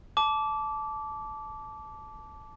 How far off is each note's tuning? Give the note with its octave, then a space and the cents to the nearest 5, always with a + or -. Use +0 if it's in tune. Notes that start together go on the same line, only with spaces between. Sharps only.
A5 -15 D6 -15